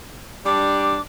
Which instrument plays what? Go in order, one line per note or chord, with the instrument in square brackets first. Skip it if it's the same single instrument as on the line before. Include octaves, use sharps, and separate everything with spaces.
[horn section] G3 D4 [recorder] D6